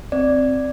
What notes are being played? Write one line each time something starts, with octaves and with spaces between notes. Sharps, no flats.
C4 D5